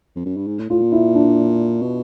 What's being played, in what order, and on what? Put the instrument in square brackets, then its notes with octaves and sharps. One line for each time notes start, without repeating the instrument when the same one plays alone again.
[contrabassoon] F2
F#2
G2
G#2
A2
[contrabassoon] A2 [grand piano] F4
[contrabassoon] A#2
[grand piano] E4
D4
[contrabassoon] B2